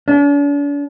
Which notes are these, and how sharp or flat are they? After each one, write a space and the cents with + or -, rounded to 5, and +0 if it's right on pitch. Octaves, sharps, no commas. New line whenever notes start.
D4 -45